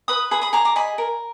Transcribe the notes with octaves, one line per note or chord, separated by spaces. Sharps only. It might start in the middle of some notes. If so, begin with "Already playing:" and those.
B4 B5 D#6
G#4 B5 D#6
B5 D#6
G#4 A#5 D6
A#5 D6
D#5 G#5 B5
A#4